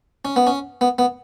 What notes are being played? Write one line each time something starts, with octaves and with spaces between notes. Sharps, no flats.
C#4
B3
C#4
B3
B3